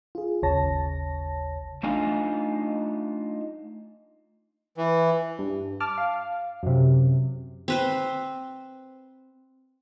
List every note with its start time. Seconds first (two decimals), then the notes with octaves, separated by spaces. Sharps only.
0.15 F4 G#4
0.42 G#1 D#2 C#3 C#5 A5 A#6
1.83 A3 D4 D#4 F4 D#5 G#5
4.77 E3
5.39 G2
5.80 A5 D6 F6
5.98 F5
6.63 F#2 C3
7.68 C4 B4 C5